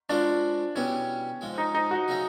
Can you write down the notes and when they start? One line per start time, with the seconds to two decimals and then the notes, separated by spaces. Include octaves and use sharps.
0.09 F3 G#3 C#4 D4 F#4 A#4
0.75 B2 G3 B3 C#4 E4
1.41 G#2 F3 G#3
1.58 D#4
1.75 D#4
1.91 F#4
2.08 C#3 F#3 A3 C#4